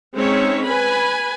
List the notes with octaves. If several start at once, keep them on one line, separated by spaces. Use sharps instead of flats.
G#3 C4 C#4 D#4 C#5 E5
B4 G#5 B5